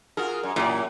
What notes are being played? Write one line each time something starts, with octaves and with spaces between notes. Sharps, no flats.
F4 F#4 G#4 A#4
F#2
F#2 A#2 E3 G4 D5